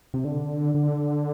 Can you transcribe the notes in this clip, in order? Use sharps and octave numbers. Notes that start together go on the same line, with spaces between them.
C3
D3
D3